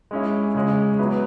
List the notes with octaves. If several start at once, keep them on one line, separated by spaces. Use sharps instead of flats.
G#3 C#4 E4
C#3 G#3 C#4
F#3 B3 E4 B4